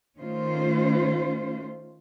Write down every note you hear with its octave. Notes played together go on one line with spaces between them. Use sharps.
D#3 A3 C#4 F4 C5